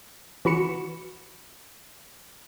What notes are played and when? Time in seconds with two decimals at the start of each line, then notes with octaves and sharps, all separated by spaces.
0.45 E3 F#4 B5 C#7 E7